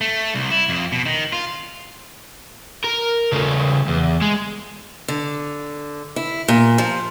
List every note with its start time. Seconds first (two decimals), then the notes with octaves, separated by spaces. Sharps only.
0.01 A3
0.34 C2
0.51 E4
0.69 F2
0.92 B2
1.06 D#3
1.33 F4
2.84 A#4
3.32 C#3 A3
3.88 E2
4.22 G#3
5.08 D3
6.16 E4
6.48 A#2
6.78 F3